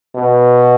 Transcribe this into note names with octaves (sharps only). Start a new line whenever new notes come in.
B2